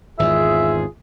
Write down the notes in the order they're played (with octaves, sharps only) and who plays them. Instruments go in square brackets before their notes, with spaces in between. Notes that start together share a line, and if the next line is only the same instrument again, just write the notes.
[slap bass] G#1 E2 [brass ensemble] F4 G#4 [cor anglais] E5